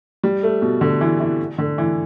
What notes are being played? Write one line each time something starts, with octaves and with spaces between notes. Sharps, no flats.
G3
A3
B2
D3
E3
E3
D3
E3